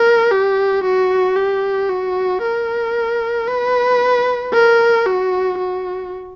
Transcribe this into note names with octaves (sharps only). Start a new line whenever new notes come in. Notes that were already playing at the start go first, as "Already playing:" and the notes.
Already playing: A#4
G4
F#4
G4
F#4
A#4
B4
A#4
F#4
F#4